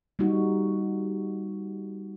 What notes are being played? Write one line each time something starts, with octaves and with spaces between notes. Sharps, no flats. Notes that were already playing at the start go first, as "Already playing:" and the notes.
G3 A#3 D#4 F#4